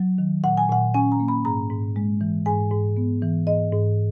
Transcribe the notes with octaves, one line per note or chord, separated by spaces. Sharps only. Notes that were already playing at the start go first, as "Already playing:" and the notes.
Already playing: F#3
D#3
A#2 F#5
G#5
A#2 F#5
C#4 G#5
A#5
A#3
B5
G#2 A#5
G#2
G#3
E3
G#2 G#5
G#2
B3
E3
G#2 D#5
G#2